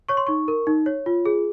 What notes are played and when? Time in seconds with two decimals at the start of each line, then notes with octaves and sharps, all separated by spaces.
0.09 C#5 C#6
0.17 C6
0.27 D#4 C#6
0.48 A#4
0.67 D#4
0.86 C#5
1.06 F4
1.26 G#4